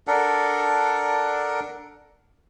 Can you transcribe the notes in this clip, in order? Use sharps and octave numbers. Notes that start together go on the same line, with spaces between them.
D4 A4 A#4 F#5